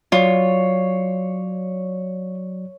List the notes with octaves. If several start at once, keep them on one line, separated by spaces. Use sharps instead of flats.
F#3 F4 C#5 D5